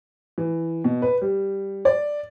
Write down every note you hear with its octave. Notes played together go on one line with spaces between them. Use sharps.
E3
B2
B4
G3
D5